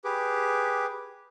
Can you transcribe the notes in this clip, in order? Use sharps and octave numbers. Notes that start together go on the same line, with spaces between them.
G4 G#4 B4 D6